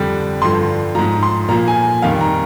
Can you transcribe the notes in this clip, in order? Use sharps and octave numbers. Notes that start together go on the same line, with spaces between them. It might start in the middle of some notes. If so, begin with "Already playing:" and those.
Already playing: F2 D3 G3
G2 D3 F3 C6
G#2 F3 A#5
C6
A#2 F3 A#5
G#5
F2 D#3 G3 F5
A#5